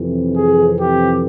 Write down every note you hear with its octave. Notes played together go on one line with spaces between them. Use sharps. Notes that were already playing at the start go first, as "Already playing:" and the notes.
Already playing: F2 C3 E3
G#4
G4